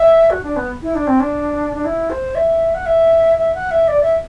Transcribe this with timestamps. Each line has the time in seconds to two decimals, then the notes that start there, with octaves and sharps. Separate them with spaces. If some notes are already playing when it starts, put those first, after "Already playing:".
Already playing: E5
0.31 F#4
0.43 D4
0.56 B3
0.82 E4
0.95 D4
1.07 C4
1.20 D4
1.74 D4
1.85 E4
2.10 C5
2.35 E5
2.75 F#5
2.86 E5
3.37 E5
3.54 F#5
3.71 E5
3.88 D5
4.02 E5